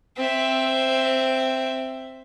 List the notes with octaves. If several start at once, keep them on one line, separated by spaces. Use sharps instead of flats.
C4 E5